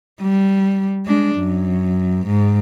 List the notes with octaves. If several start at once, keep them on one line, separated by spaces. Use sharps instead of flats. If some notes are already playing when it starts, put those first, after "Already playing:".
G3
G#3 D4
F#2
G#2